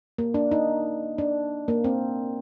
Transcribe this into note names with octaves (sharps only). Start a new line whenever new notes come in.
A#3
D4
D#4
D4
A#3
C4